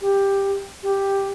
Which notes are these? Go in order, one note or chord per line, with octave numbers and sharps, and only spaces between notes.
G4
G4